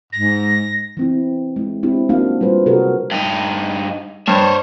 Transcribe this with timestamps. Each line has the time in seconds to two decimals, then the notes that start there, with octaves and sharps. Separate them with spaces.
0.13 G#2 A#6
0.97 E3 C4 E4
1.56 G#3 E4
1.83 C4 D4 E4 G4
2.09 A#3 C4 D4 D#4 F#4 F5
2.41 G3 F4 B4 C5
2.66 C3 F#4 G#4 A#4
3.12 G2 D#4
4.28 G2 C5 C#5